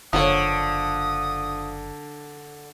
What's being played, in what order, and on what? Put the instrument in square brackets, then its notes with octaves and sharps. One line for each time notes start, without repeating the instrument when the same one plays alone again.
[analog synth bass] F#1 [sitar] D3 [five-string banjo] F3 A#3 C#5 [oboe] D#6